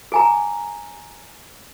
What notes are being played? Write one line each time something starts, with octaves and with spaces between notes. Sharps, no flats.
G#4 G#5 A#5